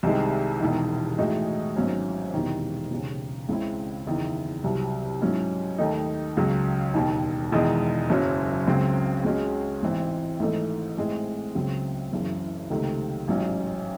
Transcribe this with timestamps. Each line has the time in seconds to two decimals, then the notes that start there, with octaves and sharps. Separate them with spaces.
0.03 C2 C3 D#3 G#3
0.60 E1 E2 D#3
1.18 A2 E3 G#3 D#4 F#4
1.76 G#1 G#2 F#3 C#4
2.34 E1 E2 C3 D#3
2.91 E1 D#2 C#3
3.49 C#2 C#3 G#3 C4 E4
4.06 F#1 E2 D#3
4.64 C2 C3 F#3
5.21 G#2 F#3 C#4 E4
5.78 D#2 D#3 A3 D#4
6.37 C#2 C#3 F#3
6.94 E1 D#2 D#3
7.52 E1 E2 D#3 G#3 D#4
8.09 F#1 F#2 C#3 F#3 C#4
8.67 C#2 C#3 F#3 C4
9.24 C#2 C#3 G#3 C#4 F#4
9.82 A1 G#2 E3 C4
10.40 G#1 G#2 E3 A3 D#4
10.98 A2 G#3 C4
11.55 C#2 C#3 F#3 C4
12.12 F#1 F#2 C#3 E3
12.70 C#2 C3 D#3 A3
13.28 A1 G#2 F#3 C#4